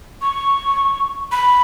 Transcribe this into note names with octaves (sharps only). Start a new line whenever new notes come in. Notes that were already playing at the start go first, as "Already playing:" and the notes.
C#6
B5